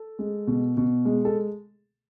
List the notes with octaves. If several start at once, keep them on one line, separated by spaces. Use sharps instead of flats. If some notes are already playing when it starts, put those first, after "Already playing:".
Already playing: A4
G#3
B2
B2
G#3
A4